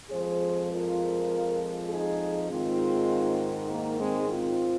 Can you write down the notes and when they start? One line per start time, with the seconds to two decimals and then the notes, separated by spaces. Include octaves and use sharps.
0.10 F2 F3 G#3 G#4 C5
0.71 F4 A#4
1.90 D#4 G#4
2.50 G#2 D#3 G#3 C4 F4
3.70 A#3 D#4
4.00 G#3 C4
4.30 C4 F4